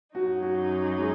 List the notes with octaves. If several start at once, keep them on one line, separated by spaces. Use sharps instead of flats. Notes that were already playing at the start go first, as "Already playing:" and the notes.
F#2 F#3 D#4 F#4
F#4
G#3